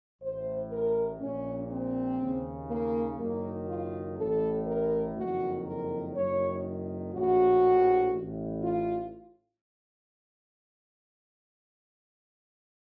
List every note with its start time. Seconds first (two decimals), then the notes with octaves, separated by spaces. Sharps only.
0.22 A1 A2 C5
0.72 A#4
1.21 A#1 A#2 C#4
1.71 C4
2.20 D#2 C#3
2.69 A#3
3.19 F#1 F#2 D#3 A#3
3.68 F4
4.18 A1 A2 A4
4.67 A#4
5.17 F#1 F2 D#3 F#4
5.65 A#4
6.15 F#1 F#2 D#3 C#5
7.14 A#1 A2 F#4
8.13 A1 A2
8.62 F4